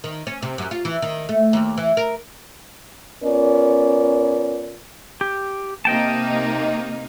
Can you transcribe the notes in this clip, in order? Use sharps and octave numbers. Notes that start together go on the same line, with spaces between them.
D#3
C#4
C3
F#2
F4
E3
D#3
A3
D#2
E3
A#4
B3 C#4 F4 A#4 D5
G4
C3 A#3 D#4 D#5 G5 A5